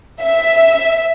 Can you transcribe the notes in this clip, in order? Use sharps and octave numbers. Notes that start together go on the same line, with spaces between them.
E5